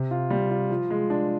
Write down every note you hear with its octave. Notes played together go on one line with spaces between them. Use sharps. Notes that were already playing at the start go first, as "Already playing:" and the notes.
Already playing: C3
F4
G3
F4
F3
G#3
D4